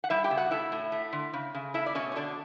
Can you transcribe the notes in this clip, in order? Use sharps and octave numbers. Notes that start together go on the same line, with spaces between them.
F#5
G3 E4 E5
G4 G5
C#3
F#4 F#5
A3 E4 E5
A2
A3
D3
C#3
C#3
A3 E4 E5
D5
B2 C#4 C#5
C#5
D3 D4 D5